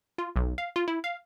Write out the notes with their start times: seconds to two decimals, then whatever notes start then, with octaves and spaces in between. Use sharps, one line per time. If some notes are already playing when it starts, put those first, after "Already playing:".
0.18 F4
0.36 B1
0.58 F5
0.76 F4
0.88 E4
1.04 F5